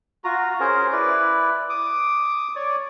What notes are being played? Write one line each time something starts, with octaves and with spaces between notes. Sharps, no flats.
F4 F#4 A#5
C#4 G#4 A#4 C5
E4 B4 D5
D6 D#6
C#5 D5